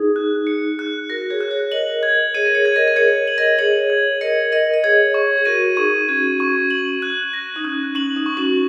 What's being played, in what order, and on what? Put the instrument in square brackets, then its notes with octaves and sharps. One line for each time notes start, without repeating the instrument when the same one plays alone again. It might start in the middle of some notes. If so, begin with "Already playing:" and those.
Already playing: [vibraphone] D#4 G#4
[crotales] F#6
C#7
F#6
[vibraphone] F#4 A#4 [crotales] A#6
[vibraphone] G#4 C#5
[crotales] F#6
[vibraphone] G#4 C#5
[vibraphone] A#4 D#5 [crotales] F#7
[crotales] G#6
[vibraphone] G#4 C#5 [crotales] D#7
[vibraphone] A#4
G#4 C#5
[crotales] G#6
[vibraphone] A#4 D#5
A#4
[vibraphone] G#4 C#5 [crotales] G#6
[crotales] F#7
[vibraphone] A#4 D#5
[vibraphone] G#4 C#5 [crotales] F#7
[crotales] G#6
[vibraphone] A#4 D#5 [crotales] C#7
[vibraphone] A#4 D#5 [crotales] F#7
[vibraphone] D#5
[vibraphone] G#4 C#5 [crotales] G#6
[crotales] C#6
[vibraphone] G#4
[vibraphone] F#4 A#4 [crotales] D#7
[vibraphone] D#4 G#4 [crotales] C#6
[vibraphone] C#4 F#4 [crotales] G#6
[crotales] C#6
F#7
F#6
A#6
[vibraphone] D#4
[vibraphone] C#4 [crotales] F#6
[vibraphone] C#4 [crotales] F#7
[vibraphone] D#4
[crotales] C#6
[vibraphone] C#4 F#4